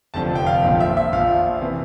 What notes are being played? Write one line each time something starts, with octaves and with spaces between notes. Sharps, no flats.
F1 F2 D3 F3 A5
G5
F5
A#1 A#2 F3
E5
E5
A#1 A#2 F3 F5
C3 E3